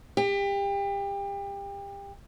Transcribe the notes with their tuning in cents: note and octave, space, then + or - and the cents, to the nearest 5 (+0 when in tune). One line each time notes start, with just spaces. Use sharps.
G4 +30